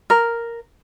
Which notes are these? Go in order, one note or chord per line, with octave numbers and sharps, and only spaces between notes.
A#4